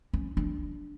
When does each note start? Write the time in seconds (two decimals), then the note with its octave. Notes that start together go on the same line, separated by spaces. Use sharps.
0.13 C#4
0.37 D4